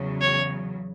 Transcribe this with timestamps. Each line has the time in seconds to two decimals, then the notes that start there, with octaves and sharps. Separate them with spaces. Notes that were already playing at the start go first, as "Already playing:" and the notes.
Already playing: E2 C#3 F#3
0.21 C#5